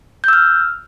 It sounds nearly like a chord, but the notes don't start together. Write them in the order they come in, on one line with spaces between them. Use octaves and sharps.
G6 E6 F6